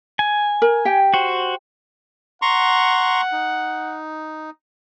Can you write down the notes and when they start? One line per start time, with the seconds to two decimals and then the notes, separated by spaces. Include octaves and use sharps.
0.19 G#5
0.62 A#4
0.85 G4 G5
1.14 F#4 C5
2.42 F#5 A#5 C6 C#6
3.32 D#4